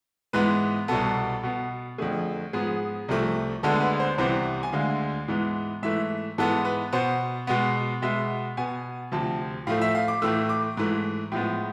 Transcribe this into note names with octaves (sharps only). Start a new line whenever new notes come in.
G#2 E3 G#3 B3 B4
C2 B2 B3 A4
B2 B3
F2 D3 A3 G#4
G#2 F3 B3 G#4
C2 C3 F3 A3
D2 D3 G#3 B3 A4
B4
C5
C2 C3 E3 B3 C5
G#5
D2 D3 G#3 F5
G#2 E3 G#3 B3
G#2 E3 A3 E5
G#2 E3 G#3 B3 A4
B4
B2 B3 C5
B2 G#3 B3
B2 G#3 B3 E5
B2 B3 G#5
D2 C3 F3 A5
A2 F3 A3 F5
E5
F5
D6
A2 E3 A3 E6
D6
G#2 E3 A3
A2 F3 G#3 B3